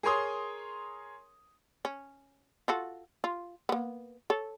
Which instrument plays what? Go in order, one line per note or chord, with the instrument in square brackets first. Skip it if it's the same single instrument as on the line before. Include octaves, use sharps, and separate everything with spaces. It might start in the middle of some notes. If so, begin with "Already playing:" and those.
[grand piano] G#4 A#4 C#5 C6 D#6
[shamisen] C#4
F4 F#4 A4
F4
A#3 B3
A4 C#5